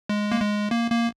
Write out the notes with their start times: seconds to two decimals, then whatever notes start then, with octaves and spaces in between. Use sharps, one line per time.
0.09 G#3
0.32 A#3
0.41 G#3
0.71 A#3
0.91 A#3